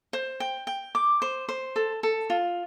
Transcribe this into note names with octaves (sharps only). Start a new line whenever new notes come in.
C5
G5
G5
D6
C5
C5
A4
A4
F4